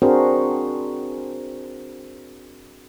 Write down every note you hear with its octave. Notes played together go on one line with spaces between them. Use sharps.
C4 D4 F#4 G#4 A#4 C5